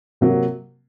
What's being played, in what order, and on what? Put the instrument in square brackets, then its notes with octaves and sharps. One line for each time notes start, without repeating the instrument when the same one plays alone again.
[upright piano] C3 F#3 A#3